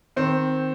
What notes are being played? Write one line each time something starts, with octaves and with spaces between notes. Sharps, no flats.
D#3 C4